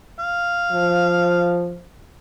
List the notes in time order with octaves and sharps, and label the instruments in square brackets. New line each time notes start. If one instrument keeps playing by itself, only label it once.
[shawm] F5
[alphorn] F3